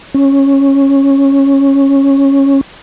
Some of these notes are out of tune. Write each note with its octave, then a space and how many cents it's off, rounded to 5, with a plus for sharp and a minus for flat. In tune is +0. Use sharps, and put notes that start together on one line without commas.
C#4 -10